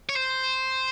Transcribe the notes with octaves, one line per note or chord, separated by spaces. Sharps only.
C#5
C5